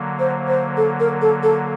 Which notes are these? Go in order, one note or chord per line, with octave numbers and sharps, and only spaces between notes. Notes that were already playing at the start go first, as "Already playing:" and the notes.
Already playing: D3 F#3 A#3
C5
C5
A4
A#4
A4
A4